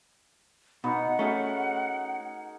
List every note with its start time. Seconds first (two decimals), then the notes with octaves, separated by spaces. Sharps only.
0.84 B2 B3 D#4 A#4 F#5
1.19 A3 C#4 F#4 G#4 A#4